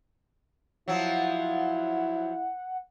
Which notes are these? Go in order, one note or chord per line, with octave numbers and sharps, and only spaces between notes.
F3 F#3 E4 F#5